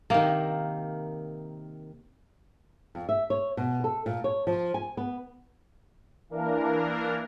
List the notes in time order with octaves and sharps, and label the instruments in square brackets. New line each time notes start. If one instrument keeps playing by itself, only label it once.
[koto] C3 D#3 [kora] A#3
[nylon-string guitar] F2
E5
C#5
B2
A4
A#2
C#5
F3
G#5
B3
[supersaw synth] E3 A#3 D4 A#4